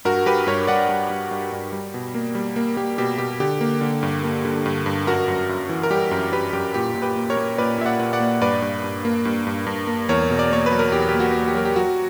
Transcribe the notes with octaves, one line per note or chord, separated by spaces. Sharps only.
G2 F#4 A#4
G2 G4 B4
G2 A#4 C#5
G2 D5 F#5
G2
G2
G2
G2
G3
B2
A#3
G3
A#3
A#3 G4
B2 G4
B2 G4
D3 G4
A#3
D3
G2
A#3
D3
G2
G2
F#2 F#4 A#4
F#2
F#2
E3
A#4
G3 G4
F#2
F#2 G4 B4
F#2 G4
A#2 G4
A#2
G4 B4
A#3
A#4 C#5
A#3
A#2 B4 D5
A#2 E5
D5 F#5
A#2
D5 F#5
A#3
G2 B4 D5
G2
G2
A#3
G2
G2
G2
A#3
E2 A#4 C#5
B2
D5
A#3 C#5
B4
F#3
A#4
E2 G4
A#3 G4
F#4
A#3
G4
F#3 A#4
G4
F#3 F#4